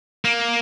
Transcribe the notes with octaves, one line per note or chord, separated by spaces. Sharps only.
A#3